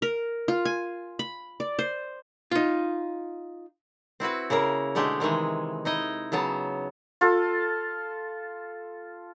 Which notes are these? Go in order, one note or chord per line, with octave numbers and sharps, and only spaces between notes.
A#4
F4
G#5
B5
D5
C5
D#4 F4
C4 E4 F#4 B4
C#3 A#3 E4 A#4
B2 D3 G#3 A3 G4
C3 D#3 E3 G#3
D#4 E4 D#5
C#3 F#3 B3 A5
F4 A4